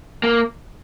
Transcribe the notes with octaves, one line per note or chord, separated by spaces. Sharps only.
A#3